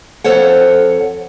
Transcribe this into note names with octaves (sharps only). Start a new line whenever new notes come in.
F2 A4 C5 C#5 F#5